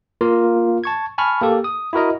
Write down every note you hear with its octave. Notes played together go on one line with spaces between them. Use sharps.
A#3 F4 A#4
A5 C#6 G#6
G#5 A5 B5 C#6 F6
A#3 G4 A4
D#6
E4 F#4 A#4 D#5